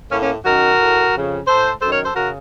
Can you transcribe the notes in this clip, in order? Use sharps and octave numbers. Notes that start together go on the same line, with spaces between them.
A2 A#3 C#4
A#3 C#4
F#2 D#3 F#4 A#4
A2
F2 C#3
A2 A4 C5
F#2 D#3 A4 C5
A#4 C#5
A4 C5
C#3 F#4 A#4